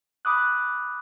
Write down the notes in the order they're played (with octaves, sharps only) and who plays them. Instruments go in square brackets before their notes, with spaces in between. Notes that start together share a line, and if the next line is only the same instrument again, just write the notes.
[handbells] B5 D6 D#6 F#6